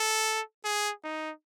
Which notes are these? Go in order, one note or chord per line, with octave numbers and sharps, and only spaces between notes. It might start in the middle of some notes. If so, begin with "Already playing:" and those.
Already playing: A4
G#4
D#4